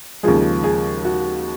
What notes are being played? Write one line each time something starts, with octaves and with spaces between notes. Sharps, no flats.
D#2 C#3 F3 G#3 G#4
G#4
F#4